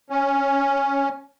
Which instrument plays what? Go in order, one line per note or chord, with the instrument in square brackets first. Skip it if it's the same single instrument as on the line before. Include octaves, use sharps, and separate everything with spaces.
[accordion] C#4